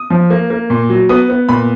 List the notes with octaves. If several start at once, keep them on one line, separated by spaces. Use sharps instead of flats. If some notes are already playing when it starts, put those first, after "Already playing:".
Already playing: D#6
F3
A#3
A#3
A#2
F#3
B3 D#6
B3
A#2 B5